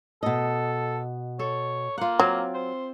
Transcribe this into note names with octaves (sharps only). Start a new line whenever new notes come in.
B2 A4 D#5
A4 C#5
A#3 F4 F#5
F#3 C4 F5
C5